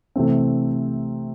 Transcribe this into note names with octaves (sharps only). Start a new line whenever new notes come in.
C3 E3 A3 C4